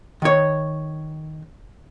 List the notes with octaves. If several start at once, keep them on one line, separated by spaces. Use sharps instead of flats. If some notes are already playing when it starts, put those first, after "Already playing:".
D#3 C#5